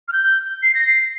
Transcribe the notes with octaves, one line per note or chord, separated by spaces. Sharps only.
F6
G6
C7
A#6
C7